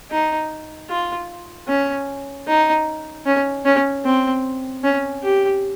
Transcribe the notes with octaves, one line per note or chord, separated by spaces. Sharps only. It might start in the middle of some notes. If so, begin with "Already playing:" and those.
D#4
F4
C#4
D#4
C#4
C#4
C4
C#4
G4